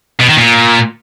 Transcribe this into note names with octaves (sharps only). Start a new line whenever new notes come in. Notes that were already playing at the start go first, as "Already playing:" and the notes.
B2
D#3
A#2